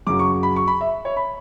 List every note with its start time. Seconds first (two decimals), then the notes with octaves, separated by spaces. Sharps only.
0.07 F#2 C#3 F#3 D6
0.19 C#6
0.43 B5
0.56 C#6
0.67 B5
0.81 E5
1.05 C#5
1.17 B5